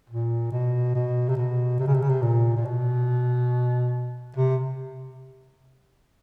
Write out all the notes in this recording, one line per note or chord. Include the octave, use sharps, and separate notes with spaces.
A#2
B2
B2
C3
B2
C3
C#3
C3
C#3
C3
A#2
A#2
B2
C3